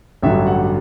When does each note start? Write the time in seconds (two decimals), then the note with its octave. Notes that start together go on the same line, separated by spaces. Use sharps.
0.22 A1 G2 D3 F#3 E5
0.47 F#5